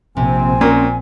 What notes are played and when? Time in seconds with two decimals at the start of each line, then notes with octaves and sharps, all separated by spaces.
0.17 A#1 C3 C4 G#5
0.61 A#2 C#4 A#4